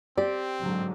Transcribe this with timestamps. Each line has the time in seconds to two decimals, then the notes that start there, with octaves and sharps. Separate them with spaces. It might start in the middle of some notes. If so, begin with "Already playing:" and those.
0.17 C4 G4 D5
0.60 G#2 D3 F#3